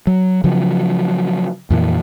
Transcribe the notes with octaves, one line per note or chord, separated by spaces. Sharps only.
F#3
C#3 F3 F#3
F2 A#2 E3